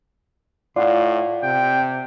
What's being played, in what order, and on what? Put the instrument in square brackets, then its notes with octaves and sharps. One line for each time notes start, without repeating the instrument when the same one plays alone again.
[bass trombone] A2 [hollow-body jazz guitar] F4 [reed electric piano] D5 F#5
[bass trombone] C3 [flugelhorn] G5